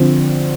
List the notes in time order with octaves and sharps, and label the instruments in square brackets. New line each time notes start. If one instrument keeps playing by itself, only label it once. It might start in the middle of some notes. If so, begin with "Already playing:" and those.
Already playing: [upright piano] D3 F3 C4 F4